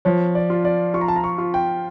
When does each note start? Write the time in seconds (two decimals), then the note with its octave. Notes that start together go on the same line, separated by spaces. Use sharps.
0.05 F3 C#5
0.35 D5
0.50 F4
0.65 D5
0.94 F4 C#6
1.01 A#5
1.08 A5
1.16 A#5
1.24 C#6
1.38 F4
1.54 G5